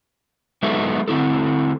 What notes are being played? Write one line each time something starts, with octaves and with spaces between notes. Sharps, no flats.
F#3 G#3 B3 D#4 A4 E5
D3 C4 E4 A4